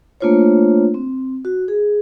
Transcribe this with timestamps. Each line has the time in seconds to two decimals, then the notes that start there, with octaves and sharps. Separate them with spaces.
0.20 A3 A#3 D4 F4 C5 C#5
0.94 C4
1.45 F#4
1.68 G#4